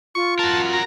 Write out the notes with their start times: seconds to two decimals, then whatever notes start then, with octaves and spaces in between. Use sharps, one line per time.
0.15 F4 C#6
0.39 F#4 A#4 A5
0.73 A#5